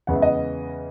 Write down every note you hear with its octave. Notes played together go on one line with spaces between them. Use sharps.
E2 C#3 G#3 B3 F#5
E5
D#5 F#5